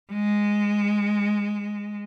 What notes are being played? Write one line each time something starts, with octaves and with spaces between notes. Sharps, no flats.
G#3